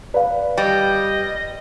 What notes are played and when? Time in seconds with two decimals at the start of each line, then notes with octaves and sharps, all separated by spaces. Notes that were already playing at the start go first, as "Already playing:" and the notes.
0.14 B4 D5 F5
0.58 G3 D#5